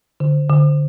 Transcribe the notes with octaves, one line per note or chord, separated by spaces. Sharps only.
D3
D3